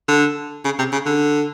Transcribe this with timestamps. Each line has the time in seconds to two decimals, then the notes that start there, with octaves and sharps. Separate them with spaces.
0.09 D3
0.65 C#3
0.79 C3
0.93 C#3
1.06 D3